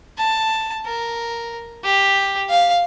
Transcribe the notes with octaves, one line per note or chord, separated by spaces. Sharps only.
A5
A#4
G4
F5